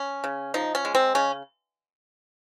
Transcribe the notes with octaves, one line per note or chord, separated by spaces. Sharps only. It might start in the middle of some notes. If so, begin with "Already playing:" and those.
Already playing: C#4
C#3
F3 D#4
C#4
G#3
C4
C#3 C#4